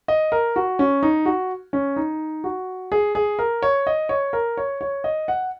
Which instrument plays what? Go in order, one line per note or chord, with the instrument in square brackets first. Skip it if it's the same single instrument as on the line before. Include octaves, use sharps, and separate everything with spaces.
[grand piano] D#5
A#4
F#4
C#4
D#4
F#4
C#4
D#4
F#4
G#4
G#4
A#4
C#5
D#5
C#5
A#4
C#5
C#5
D#5
F#5